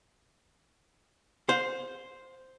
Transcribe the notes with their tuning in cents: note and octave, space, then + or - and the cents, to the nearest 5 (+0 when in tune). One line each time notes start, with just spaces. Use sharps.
C5 +0 F5 +35